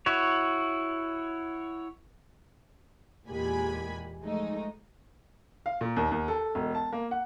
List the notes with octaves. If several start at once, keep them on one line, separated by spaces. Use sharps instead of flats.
E4 F#4 C#5
E2 A#2 G#3 G4 G#5 B5
F3 G#3 A3 D#4
F5
A#2
D#2
D#2
A4
E1
A5
A#3
F#5